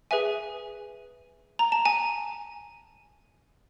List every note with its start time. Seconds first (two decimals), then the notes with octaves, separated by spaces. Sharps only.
0.11 G#4 B4 E5 G#5
1.59 A#5
1.72 A5
1.85 G#5